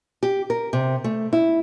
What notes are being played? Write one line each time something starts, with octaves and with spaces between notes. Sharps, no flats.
G4
A#4
C3
A3
E4